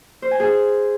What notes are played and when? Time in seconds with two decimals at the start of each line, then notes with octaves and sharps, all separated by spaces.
0.22 C5
0.31 G#5
0.40 G#4